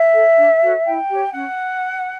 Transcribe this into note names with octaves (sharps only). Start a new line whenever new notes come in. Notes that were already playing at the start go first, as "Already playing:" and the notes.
Already playing: E5
A4 C#5
D4
F#4 A4 C#5
E4 G5
G4 C#5
C#4 F#5